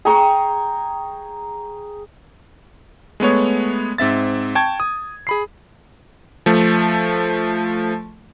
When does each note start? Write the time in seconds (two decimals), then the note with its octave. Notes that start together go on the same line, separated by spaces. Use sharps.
0.05 G#4 G5 A#5 C#6
3.20 G#3 A3 B3 C#5
3.98 G#2 C4 E5 A6
4.55 G5 A5 C#6 G#6
4.80 D#6
5.27 G#4 B5 C7
6.46 F3 A3